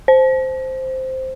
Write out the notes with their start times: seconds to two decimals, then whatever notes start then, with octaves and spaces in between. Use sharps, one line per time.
0.08 C5